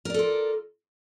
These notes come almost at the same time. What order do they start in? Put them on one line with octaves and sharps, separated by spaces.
A#4 D5 A4 F4